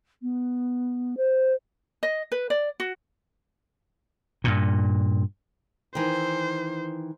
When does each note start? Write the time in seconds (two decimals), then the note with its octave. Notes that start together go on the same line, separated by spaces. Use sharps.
0.22 B3
1.17 C5
2.03 D#5
2.32 B4
2.50 D5
2.80 F#4
4.44 G2 A#2
5.95 D#3 E3 C5